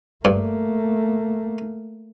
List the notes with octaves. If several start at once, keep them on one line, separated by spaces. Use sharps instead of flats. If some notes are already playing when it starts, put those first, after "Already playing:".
G2 A3 A#3